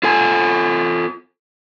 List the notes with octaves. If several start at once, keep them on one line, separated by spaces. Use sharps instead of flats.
F4 A4 G#5